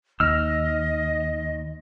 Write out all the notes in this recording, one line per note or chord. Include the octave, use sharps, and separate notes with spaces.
D#2 D#5 E6 F6